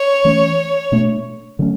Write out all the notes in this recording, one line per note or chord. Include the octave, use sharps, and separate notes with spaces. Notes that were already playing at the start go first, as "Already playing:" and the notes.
Already playing: C#5
E3 A3 C#4
B2 A3 D4
D3 F#3 A3 C#4